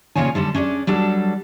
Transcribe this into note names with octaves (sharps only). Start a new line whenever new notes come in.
A#2 C#3 F3 F4 C#5 G#5
D3 G3 A4 C5
C#4 D4 G#4 D5
F#3 G3 D4 A4